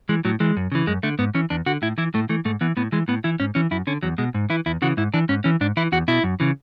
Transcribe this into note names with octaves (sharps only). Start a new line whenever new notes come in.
E3 G#3
A2 F#3
E3 G#3
F#2
C#3 E3
F#2 G#3
D3 A3
G#2 B3
E3 C#4
E2 D4
D3 F#4
A2 E4
E3 E4
A2 A3
E3 A3
G#2 A3
E3 B3
A2 B3
E3 G#3
A2 B3
E3 E4
G#2 C#4
E3 C#4
F#2 E4
D3 C#4
E2 F#3
B2 G#3
G#2
E3 E4
E2 E4
C#3 E3 F#4
G#2 E4
E3 D4
G#2 C#4
E3 C#4
G#2 D4
E3 E4
E2 F#4
B2 E4
F#2
C#3 E3